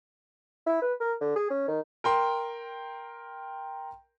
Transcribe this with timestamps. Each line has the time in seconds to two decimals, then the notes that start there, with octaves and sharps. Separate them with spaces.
0.66 E4
0.82 B4
1.00 A#4
1.21 D3
1.36 G#4
1.50 C#4
1.68 D#3
2.04 A#4 G5 C6